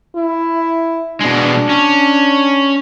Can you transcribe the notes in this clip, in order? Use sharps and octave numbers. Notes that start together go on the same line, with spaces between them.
E4
B2 G#3 D4
C#4